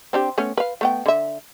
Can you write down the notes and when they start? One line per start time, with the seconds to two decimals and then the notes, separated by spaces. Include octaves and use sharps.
0.13 C4 D4 G4
0.38 A3 B3 C#4
0.57 B4 F5
0.81 A3 B3 G5
1.06 D3 E5